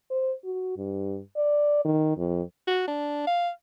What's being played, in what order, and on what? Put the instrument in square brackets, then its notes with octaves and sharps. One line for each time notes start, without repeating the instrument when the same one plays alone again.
[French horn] C5
F#4
G2
D5
D#3
F2
[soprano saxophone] F#4
D4
F5